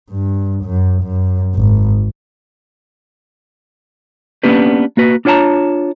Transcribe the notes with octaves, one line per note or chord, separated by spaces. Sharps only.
G2
F#2
F#2
G#1
A#3 B3 C#4 D4 G4 B4
A#3 F#4 B4
D4 F4 C#5 F#5 A5 A#5